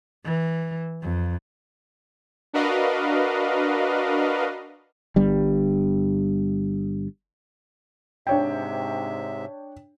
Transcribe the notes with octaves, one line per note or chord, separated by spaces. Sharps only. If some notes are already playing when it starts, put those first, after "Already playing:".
E3
F2
D4 F#4 A#4 B4 D#5 F5
G1 G2 G3
G#2 C3 D4 C#5 E5 G5